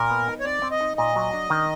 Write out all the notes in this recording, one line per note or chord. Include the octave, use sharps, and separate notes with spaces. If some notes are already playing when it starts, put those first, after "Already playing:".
Already playing: A#2 A#4
B3
D#4
C#5
C4 D5
C4
D#5
D#4
A#2 D#5
F#3
D4
D#3